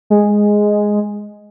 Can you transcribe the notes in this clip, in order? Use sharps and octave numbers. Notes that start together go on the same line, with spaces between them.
G#3